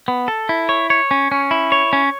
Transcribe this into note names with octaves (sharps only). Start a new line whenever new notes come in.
B3
A4
E4
C#5
C#5
C#4
C#4
E4
C#5
C#4